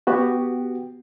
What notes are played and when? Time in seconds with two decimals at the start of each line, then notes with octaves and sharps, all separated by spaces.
0.07 B3 F#4 G4